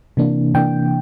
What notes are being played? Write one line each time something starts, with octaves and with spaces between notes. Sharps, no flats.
C3 E3 A#3 D4
C3 E3 A#3 D4 G5